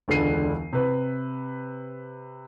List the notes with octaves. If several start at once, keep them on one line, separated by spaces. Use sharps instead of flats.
E1 C#2 D3 D4 C7 D#7
C3 B4